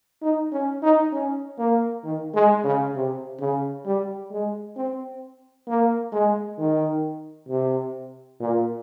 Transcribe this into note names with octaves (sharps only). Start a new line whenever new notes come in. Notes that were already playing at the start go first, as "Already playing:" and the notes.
D#4
C#4
D#4
C#4
A#3
D#3
G#3
C#3
C3
C#3
G3
G#3
C4
A#3
G#3
D#3
C3
A#2